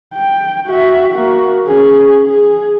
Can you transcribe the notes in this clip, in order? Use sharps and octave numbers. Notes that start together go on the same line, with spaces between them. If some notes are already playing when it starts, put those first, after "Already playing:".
G5
F#4 E5
A#3 F#4
C#4 G#4
G#4